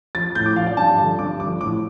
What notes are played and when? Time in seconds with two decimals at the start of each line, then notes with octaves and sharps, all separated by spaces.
0.15 F3 A6
0.35 A2 G6
0.46 D6
0.56 F3 F5
0.66 D5
0.77 G2 A5
0.98 D3 F3
1.19 G2 D6
1.40 D3 F3 D6
1.60 A2 D6